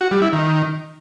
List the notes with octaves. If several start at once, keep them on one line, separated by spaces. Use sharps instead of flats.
F#4
G3
E4
D#3